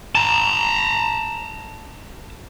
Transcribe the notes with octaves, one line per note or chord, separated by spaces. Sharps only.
A5 A#5